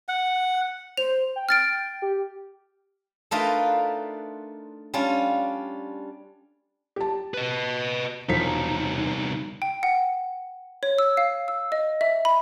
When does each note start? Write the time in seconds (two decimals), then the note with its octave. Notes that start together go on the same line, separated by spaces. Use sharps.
0.08 F#5
0.97 C5 F7
1.36 G5
1.49 F6 A6 D7
2.02 G4
3.31 A3 D4 D#4 F4 A#4 B4
4.94 G3 C#4 D4 F4
6.96 G4 A5
7.34 B4 D#5
8.29 E1 C2 F3 D#4 B6
9.62 G5
9.83 F#5
10.83 C#5
10.98 E6
11.17 F5
11.48 E6
11.72 D#5
12.01 E5
12.25 B5